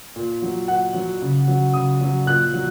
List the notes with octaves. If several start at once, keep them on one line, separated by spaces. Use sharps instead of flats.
A#2
F#3
A#2 F#5
F#3
C#3
F#3
C#3 D#6
F#3
A#2 F#6
F#3